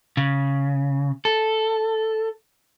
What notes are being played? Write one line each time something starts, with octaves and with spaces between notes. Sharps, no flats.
C#3
A4